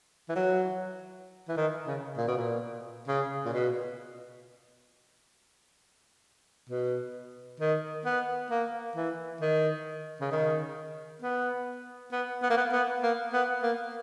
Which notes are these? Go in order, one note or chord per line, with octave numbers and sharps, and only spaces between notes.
E3
F#3
E3
D#3
C#3
A#2
B2
A#2
C#3
A#2
B2
B2
D#3
B3
A#3
E3
D#3
C#3
D#3
B3
B3
B3
A#3
B3
B3
A#3
B3
A#3